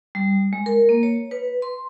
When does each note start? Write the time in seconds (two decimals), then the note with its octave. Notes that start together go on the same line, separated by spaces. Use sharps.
0.15 G3
0.53 G#3
0.66 A#4
0.89 A#3
1.03 C#5
1.31 B4
1.62 C6